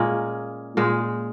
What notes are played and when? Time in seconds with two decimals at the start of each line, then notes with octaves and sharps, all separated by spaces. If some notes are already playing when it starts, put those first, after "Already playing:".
Already playing: A#2 G#3 A#3 C#4
0.77 A#2 G#3